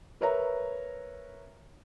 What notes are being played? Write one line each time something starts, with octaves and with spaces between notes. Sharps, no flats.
A#4 B4 C#5 E5 A#5